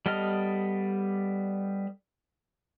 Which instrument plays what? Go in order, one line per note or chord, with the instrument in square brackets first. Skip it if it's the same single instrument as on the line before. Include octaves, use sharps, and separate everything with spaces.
[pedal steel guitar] G3 B3 A4 D#5 F6